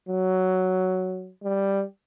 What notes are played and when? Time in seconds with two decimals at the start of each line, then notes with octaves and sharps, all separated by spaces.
0.09 F#3
1.43 G3